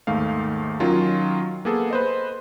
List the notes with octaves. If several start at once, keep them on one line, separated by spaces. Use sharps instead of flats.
D#2 G#2 A3 F5
D#3 F#3 C#4 F4
A#3 B3 G#4 A4
B4 C5 D#5